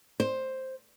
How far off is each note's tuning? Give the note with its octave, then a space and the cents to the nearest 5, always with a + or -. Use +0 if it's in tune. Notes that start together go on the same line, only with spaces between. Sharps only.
C5 +5